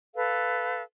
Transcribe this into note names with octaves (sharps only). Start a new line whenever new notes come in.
A4 B4 F5